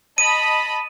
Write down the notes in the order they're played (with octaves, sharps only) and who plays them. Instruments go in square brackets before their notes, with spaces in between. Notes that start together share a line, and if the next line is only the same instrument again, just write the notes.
[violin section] D#5 A5 B5 [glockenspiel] D#7